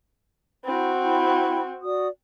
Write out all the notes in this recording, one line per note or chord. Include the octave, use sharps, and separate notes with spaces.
C4 E4 F#4 B5
E4 G5 B5
F#4 D5 D#6